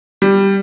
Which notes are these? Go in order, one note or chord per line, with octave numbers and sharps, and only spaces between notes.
G3